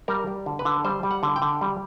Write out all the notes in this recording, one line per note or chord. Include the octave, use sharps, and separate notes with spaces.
G3 A#4
G3
D3
B4
D3
G3 C5
G3
F#5
D3
G5
D3
G3